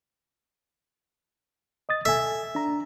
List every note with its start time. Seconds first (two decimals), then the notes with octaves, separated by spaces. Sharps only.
1.89 D#5 D#6 A6
2.05 A4 E5 G#5
2.55 D4 A#5